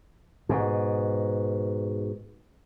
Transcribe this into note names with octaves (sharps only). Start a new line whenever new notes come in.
G#2 B2